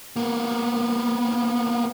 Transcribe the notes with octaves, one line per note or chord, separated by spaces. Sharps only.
A#3 B3